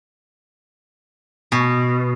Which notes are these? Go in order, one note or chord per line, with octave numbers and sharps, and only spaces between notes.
B2